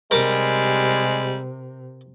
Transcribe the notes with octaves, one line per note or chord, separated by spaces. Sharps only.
C3 G3 G#3 A#4 D6